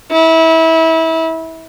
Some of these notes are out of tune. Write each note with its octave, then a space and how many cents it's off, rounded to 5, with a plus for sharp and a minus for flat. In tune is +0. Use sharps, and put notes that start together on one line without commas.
E4 -25